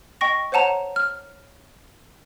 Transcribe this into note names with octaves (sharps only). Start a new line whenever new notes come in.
D#5 G5 C#6 A#6
C5 C#5 F#5 A5 A#5
F6